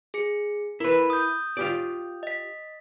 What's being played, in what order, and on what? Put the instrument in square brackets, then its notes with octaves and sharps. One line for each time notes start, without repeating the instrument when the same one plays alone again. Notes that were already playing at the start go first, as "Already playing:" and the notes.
[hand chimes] G#4 C#7
[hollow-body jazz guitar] E4 B4 [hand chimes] A#4 B5
[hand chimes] D#6 G6
[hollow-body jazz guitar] F4 G4 D5
[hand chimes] D#5 B6